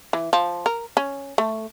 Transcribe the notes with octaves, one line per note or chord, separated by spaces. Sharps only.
E3
F3
A#4
C#4
A3